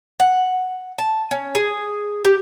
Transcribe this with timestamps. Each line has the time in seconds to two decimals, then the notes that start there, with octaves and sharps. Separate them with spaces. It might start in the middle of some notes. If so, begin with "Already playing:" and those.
0.20 F#5
0.98 A5
1.31 C#4
1.55 G#4
2.25 G4